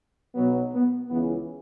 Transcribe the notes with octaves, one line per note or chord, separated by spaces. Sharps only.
B1 B2 F#3 B3
B3
C#2 C#3 E3 B3